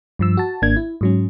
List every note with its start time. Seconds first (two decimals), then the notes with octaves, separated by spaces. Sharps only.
0.19 G2 F3 E6
0.37 F#4 A5
0.62 G#1 A#3 D4 G#6
0.76 E4
1.01 G#2 F#3 C#4